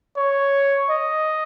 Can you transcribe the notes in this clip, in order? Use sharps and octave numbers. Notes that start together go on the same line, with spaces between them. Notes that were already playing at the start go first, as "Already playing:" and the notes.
C#5
D#5